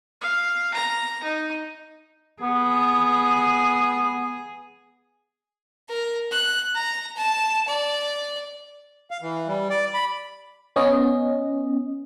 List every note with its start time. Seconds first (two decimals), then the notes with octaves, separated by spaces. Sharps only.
0.21 F5
0.74 A#5
1.23 D#4
2.42 B3 G#4
5.89 A#4
6.32 F#6
6.75 A#5
7.17 A5
7.68 D5
9.11 F5
9.22 E3
9.48 G3
9.70 D5
9.94 B5
10.76 B3 C#4 D#5